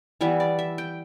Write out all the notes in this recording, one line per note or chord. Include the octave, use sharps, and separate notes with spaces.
E3 G3 B3 E5
D5
E5
G5